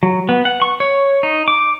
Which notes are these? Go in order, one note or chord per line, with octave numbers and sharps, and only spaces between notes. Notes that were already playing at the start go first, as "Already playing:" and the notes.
F#3
B3
F#5
C#6
C#5
D#4
D6